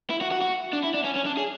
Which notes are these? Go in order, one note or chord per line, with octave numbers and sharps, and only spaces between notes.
E4
F#4
F#4
F#4
D4
E4
D4
C#4
C#4
D4
G#4